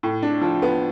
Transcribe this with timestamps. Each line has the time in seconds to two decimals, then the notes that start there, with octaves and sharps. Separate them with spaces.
0.03 A2
0.23 D4
0.42 F3
0.62 B3